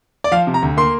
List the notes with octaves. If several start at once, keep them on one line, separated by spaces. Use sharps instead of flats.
D5
F3 F5
C3
A#5
D2
A#3 C6